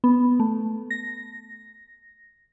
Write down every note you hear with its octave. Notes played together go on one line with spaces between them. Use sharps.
B3
A3
A#6